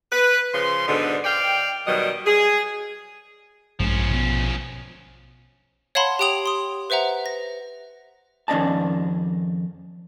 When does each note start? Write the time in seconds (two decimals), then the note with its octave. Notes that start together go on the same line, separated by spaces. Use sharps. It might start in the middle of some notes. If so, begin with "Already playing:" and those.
0.11 B4
0.53 C#3 F3 C6
0.87 G#2 B2 D3
1.24 D5 F5 G5
1.86 B2 D#3 F#3 G3 D#5
2.26 G#4
3.80 A#1 G2 F3 G#3 A3 C#4
4.11 B2 B3
5.95 C#5 F5 F#5 A5 B5 C6
6.19 G4 C#5 G5 D#6 F7
6.46 C6 D#6
6.90 B4 C5 E5 F#5 A#5
7.26 A#6
8.48 F2 D#3 C#4 D5 D#5 A5